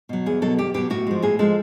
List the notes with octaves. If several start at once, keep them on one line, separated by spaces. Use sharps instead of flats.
B2 F#3
E2 G#4
B2 F#3 A4
E2 G4
B2 F#3 G4
A2 F#4
F3 G#3
A2 G#4
F3 G#3 A4